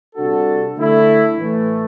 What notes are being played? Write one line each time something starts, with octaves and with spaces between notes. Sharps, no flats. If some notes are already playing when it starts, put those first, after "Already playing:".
C3 G3 D4 F#4 A4
D3 A3 E4
A2 E3 A3